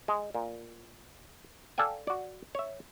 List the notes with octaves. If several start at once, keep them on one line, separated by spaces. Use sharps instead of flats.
G#3
A#2
A4 D5 F5 G5 G#5
F#4 D5
C#5 E5